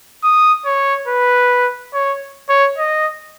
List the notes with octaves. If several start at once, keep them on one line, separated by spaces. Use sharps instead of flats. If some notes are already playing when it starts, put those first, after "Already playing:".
D#6
C#5
B4
C#5
C#5
D#5